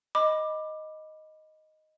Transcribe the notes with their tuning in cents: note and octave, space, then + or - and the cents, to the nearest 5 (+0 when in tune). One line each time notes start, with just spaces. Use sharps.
D#5 +0 B5 +0 D6 +15